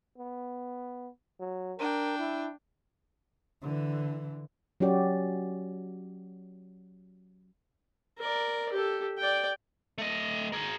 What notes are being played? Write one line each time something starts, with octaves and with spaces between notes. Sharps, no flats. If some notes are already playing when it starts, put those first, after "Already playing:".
B3
F#3
D4 A#4 G5
E4
D3 E3
F#3 C#4 F#4 G4 D5
A#4 D5
G4 A4
D5 G5
A3 D#5
G#4 A#4